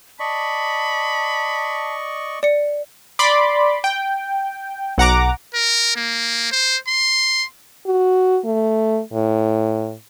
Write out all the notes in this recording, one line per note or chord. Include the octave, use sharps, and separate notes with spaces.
D5 D#5 A5 B5 C#6
D5 C#7
D5 B5 C6 D6
G5
B1 F#5 A#5 D6
A#4
A#3
C5
C6
F#4
A3
A2